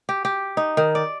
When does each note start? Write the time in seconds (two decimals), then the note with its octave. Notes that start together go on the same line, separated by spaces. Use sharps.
0.09 G4
0.25 G4
0.57 D#4
0.77 D#3
0.95 D5